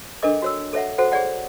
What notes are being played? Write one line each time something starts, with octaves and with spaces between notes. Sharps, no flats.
D4 A4 A#4 D#5 D6
F#4 C#5 E6
A4 C#5 E5 F#5
F#4 A4 C5 F#5
G#4 C#5 D5 F#5